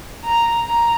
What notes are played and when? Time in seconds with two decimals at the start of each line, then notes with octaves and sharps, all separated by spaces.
0.24 A#5
0.67 A#5